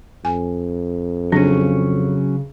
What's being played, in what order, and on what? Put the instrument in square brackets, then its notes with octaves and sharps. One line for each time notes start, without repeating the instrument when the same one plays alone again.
[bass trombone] F2 [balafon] G#5
[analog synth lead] C#3 [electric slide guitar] F#3 C#4 [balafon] D4